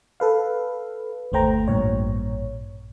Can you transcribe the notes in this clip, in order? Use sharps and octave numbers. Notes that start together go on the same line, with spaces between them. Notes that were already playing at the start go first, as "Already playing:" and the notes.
A4 B4 F5
G1 D#2 A3 C5 G5 A#5
A1 G2 A#2 C#5